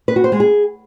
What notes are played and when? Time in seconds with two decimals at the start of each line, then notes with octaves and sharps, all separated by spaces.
0.08 B4
0.16 F#4
0.24 C5
0.32 G#3
0.40 G#4